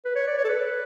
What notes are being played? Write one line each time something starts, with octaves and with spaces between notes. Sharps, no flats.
B4
C#5
D5
C#5
A4
B4